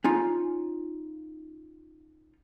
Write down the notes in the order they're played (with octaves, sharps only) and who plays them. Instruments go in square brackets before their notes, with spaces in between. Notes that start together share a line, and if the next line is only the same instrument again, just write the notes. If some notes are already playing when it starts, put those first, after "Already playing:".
[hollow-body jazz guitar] C#4 D#4 F4